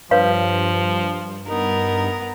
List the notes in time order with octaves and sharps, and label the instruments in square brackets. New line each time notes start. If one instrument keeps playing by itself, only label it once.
[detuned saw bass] G2 [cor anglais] F3 [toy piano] B4 C#5 F5
[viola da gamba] B3 A#4 [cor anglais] D#4